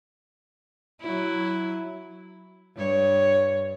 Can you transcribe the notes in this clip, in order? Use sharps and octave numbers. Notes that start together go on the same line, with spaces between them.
F#3 E4
G2 C#5